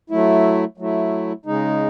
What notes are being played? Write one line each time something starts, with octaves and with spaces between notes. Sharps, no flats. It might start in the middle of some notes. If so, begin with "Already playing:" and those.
F#3 A3 E4
F#3 A3 E4
C#3 G#3 D#4